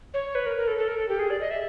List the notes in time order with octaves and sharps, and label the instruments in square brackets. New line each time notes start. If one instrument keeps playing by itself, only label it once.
[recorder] C#5
B4
A#4
A#4
A4
A4
A#4
A4
G4
G#4
D5
D#5
E5